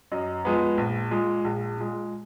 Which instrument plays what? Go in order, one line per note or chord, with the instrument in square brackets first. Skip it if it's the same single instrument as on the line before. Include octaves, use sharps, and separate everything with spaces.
[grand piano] F#2 D#5
F3 G#3 B3
A#1
A#2 G#3
A#1
A#2 G#3